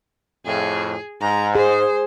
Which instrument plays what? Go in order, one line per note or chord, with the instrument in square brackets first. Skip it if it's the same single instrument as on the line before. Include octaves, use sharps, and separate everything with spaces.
[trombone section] F2 A2 [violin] G#4
[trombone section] G#2 [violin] A#5
[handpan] G#4 [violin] C5